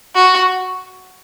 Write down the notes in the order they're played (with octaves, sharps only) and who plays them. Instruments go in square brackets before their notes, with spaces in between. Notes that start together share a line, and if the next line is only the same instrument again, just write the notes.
[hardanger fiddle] F#4